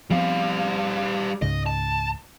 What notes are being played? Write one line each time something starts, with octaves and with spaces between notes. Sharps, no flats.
F3 G3 B3 C4 F5
C#2 G#2 C#3 D#5
A5